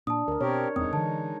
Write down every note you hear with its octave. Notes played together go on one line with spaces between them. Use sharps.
A#2 D4 A5 D#6
D2 A#4 D5
B2 C4 G4 A#4 C#5
D1 E2 G#3 C4 D#4 D#6
D3 E3 A5